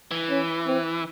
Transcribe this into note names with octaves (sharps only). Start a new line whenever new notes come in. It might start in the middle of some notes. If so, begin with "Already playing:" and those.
E3
C#4
C4